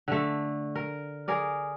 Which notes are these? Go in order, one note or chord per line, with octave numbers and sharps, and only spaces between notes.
D3 A3
A#4
G#4 A#4 D5